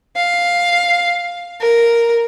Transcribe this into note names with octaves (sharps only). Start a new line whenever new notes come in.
F5
A#4